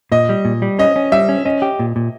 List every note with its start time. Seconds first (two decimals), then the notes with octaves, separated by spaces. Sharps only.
0.12 A#2 D#5
0.29 G3
0.45 A#2
0.62 G3
0.79 C#4 D#5
0.96 C#4
1.12 G3 E5
1.29 C#4
1.45 C#4 D#5
1.62 G4
1.79 A#2
1.96 A#2